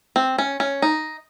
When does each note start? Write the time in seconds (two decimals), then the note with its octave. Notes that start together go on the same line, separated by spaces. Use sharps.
0.16 C4
0.38 C#4
0.60 C#4
0.82 D#4